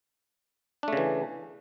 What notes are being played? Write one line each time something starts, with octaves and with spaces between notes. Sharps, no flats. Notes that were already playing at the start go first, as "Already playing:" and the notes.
C#3 E3 A3 D4